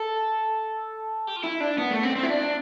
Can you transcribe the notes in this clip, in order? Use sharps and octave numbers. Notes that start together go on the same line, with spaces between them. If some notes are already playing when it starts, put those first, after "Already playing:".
Already playing: A4
G4
F4
E4
D4
B3
A3
C4
C4
E4
D4